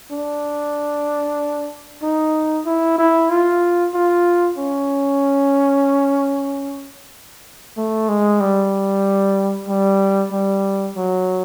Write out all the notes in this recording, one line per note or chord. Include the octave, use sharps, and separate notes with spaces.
D4
D#4
E4
E4
F4
F4
C#4
A3
G#3
G3
G3
G3
F#3